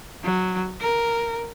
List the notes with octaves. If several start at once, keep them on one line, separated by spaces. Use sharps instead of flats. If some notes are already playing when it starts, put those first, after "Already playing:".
F#3
A#4